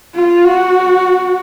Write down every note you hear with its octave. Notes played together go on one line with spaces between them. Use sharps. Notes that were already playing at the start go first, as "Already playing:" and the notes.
F4
F#4